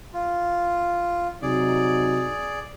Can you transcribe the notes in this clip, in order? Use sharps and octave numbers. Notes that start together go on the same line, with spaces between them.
F4
C3 F#3 D#4 G#4 D5